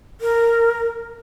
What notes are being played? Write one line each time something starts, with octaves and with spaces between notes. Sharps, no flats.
A#4